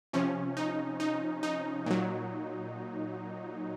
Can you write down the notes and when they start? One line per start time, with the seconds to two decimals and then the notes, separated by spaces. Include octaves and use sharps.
0.13 C3 F3 C#4
0.57 D#4
1.00 D#4
1.43 D#4
1.86 A#2 F#3